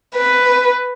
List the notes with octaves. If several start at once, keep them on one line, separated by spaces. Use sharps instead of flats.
B4